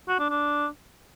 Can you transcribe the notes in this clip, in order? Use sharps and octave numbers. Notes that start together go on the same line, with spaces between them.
F#4
D4
D4